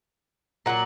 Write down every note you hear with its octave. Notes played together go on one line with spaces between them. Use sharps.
A#2 F#3 F#5